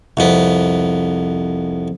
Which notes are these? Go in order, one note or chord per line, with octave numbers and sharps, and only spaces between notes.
C2 F2 B3